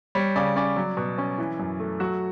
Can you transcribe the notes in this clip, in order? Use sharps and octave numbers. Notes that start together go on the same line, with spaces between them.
G3 C#5
C#3 D5
C#4 D5
F#3
B2
C#4
E3
F#2
A3
F#3 F#4